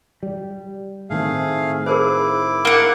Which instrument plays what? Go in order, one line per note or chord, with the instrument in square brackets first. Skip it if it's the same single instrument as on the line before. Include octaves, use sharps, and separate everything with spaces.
[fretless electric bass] G3
[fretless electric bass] A2 D#3 C4 [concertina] A3 G#4 F5
[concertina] E4 D6 [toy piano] G#4 A#4 C5
[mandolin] A#3 F#5